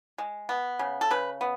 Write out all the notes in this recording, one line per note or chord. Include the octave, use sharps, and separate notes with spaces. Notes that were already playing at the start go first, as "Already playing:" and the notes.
G#3
B3
C#3
A4
C#3 B4
B3